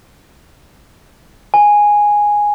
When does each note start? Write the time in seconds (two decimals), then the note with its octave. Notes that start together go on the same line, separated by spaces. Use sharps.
1.54 G#5